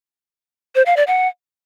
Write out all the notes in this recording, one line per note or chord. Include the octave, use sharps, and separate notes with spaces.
C5
F5
D5
F#5